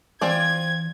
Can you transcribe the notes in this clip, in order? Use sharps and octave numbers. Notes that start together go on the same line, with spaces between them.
E3 C4 F4 D5 G#6